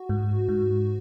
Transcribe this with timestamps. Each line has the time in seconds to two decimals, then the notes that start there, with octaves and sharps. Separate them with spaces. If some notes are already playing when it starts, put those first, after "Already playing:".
Already playing: F#4
0.09 G#2
0.49 G#2